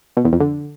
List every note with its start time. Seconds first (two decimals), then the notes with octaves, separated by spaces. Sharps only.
0.17 B2
0.25 E2
0.32 F2
0.40 D3